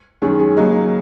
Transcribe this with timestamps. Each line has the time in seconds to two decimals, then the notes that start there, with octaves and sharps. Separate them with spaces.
0.22 F#2 D#3 G#3 C#4 G#4
0.39 G#4
0.57 C#3 F#3 A#3 D#4